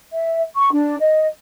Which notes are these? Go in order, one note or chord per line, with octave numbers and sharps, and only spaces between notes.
E5
C#6
D4
D#5